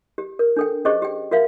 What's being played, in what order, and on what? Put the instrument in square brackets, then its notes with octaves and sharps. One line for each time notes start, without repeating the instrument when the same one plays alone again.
[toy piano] G4
A#4
D4 A4 G5
C#4 G4 G#4 C5 D#5 C#6
G4 G5
F#4 A#4 E5 F5